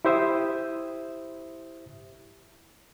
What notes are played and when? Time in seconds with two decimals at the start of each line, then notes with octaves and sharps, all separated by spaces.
0.05 E4 G4 C5 E5 D#6